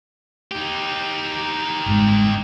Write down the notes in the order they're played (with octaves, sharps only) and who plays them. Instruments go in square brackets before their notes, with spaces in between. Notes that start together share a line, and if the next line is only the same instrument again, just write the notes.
[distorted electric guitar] D#4 G4
[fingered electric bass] G1 G#2